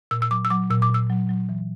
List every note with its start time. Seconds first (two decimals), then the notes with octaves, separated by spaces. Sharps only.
0.11 A#2 E6
0.22 E6
0.31 F#3 D6
0.45 E6
0.50 F#3 D6
0.70 A#2 E6
0.82 D6
0.90 A#2 E6
1.10 F#3
1.29 F#3
1.49 E3